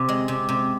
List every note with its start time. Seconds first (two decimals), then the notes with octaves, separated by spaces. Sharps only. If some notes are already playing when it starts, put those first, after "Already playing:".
Already playing: C3
0.09 G#3
0.28 C3
0.49 C3